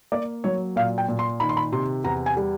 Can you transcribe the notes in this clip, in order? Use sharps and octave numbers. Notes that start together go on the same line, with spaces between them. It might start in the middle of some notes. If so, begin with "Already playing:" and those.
A#3 D5
F#3 C#5
A#2 F5
G5
A#2
C6
D#3 B5
C6
B5
C3 C6
E2 A#5
G#5
G3